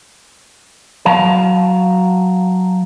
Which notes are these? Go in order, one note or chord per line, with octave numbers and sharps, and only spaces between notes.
F#3 F5 A5